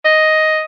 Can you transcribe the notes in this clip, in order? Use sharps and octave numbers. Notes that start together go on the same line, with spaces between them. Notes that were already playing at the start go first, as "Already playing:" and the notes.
D#5